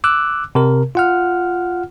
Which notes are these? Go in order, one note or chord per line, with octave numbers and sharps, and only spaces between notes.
D6 E6 F#6
C3 A#4
F4 F#5 F6